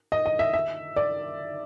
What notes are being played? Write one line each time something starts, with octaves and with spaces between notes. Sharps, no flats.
D#5
D#5
E5
E5
D5